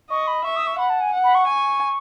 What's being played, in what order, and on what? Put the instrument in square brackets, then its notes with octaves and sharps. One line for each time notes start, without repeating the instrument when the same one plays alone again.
[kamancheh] D#5 [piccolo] C#6
[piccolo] B5
[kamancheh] E5 [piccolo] C#6
[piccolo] D#6
C#6
[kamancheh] F#5 [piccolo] B5
[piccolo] A5
G#5
[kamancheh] F#5
[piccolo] B5
C#6
[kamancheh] G#5